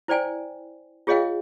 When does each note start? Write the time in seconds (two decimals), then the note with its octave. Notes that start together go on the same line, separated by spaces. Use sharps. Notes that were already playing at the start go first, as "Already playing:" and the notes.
0.08 E4 C5 D5 G5 G#5
1.07 F4 G#4 C#5 D#5 F5 G5